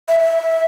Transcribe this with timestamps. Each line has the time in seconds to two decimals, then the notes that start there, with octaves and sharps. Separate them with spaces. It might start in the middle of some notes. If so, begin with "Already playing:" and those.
0.08 E5
0.20 E5